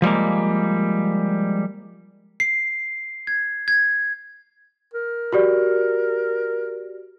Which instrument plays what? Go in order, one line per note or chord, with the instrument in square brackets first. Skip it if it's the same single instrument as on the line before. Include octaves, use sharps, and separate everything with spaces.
[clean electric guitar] F3 G3 G#3 A#3
[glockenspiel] C7
G#6
G#6
[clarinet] A#4
[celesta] F#4 G4 D5